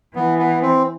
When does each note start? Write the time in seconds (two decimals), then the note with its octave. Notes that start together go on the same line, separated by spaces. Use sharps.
0.15 E3 B3
0.39 B3
0.62 C4